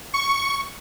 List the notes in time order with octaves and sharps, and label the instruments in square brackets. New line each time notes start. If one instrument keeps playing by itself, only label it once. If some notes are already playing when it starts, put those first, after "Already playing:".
[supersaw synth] C#6